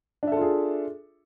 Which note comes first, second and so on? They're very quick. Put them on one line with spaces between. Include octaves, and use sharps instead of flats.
D4 E5 A4 F4 G#4